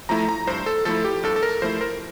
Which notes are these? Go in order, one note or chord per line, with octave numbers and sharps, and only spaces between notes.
F3 A3 E4 A#5
A#5
G2 C5
A4
F3 A3 E4 A4
G4
G2 A4
A4
A#4
F3 A3 E4 C5
A#4